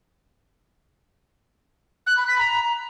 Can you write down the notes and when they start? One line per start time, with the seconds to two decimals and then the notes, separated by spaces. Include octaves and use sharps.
2.07 F#6
2.17 B5
2.28 B6
2.39 A#5